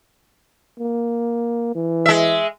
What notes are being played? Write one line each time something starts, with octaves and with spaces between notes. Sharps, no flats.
A#3
E3
G#3 E5